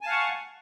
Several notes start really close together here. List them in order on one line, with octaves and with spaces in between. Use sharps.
G#5 A5 F5 F#5 C#6